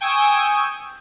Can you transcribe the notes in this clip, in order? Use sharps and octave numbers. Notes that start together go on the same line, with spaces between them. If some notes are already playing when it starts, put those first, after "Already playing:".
G5 G#5 C#6 D#6 E6 G#6